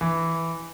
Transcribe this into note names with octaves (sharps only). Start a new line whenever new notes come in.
E3